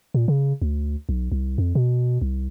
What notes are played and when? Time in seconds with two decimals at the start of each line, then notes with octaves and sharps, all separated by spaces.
0.14 A#2
0.28 C#3
0.62 D2
1.09 B1
1.32 C2
1.58 F2
1.75 B2
2.22 C2